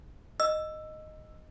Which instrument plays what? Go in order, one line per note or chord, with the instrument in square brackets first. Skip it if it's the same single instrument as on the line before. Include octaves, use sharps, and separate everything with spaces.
[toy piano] D#5 [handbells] E6